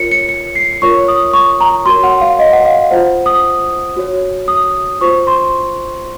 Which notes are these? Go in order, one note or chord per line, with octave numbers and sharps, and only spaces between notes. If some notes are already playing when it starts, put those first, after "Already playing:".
Already playing: F4 A#4 C#5 C#7
C#7
C#7
C7
F4 A#4 C#5 C#6
D#6
C#6
A#5
F#4 A#4 C#5 C6
F#5
F5
D#5
F#5
F5
F4 C5 F#5
D#6
F#4 C#5
D#6
F4 C5 C#6
C6